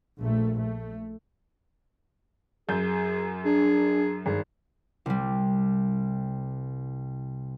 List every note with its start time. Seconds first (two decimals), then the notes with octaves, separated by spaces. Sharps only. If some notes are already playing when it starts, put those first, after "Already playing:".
0.21 A#1 A3
0.60 A3
2.69 F#2 G#4 G6
3.45 D4 G#4
4.26 G#1 G2 G#4
5.06 C2 G3